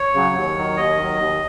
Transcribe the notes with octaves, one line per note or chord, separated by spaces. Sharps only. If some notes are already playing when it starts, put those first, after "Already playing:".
Already playing: C#5
C#3 F#3
D#2
D#3 F#3
D#2 D#5
D#3 F#3
D#2